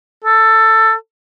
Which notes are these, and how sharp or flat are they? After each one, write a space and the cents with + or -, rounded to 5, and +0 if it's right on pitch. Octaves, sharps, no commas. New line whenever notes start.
A4 +15